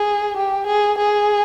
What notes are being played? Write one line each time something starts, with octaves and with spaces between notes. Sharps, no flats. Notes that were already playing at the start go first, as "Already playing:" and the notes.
Already playing: G#4
G4
G#4
G#4